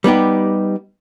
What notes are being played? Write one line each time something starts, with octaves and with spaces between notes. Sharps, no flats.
G3 B3 D#4 G4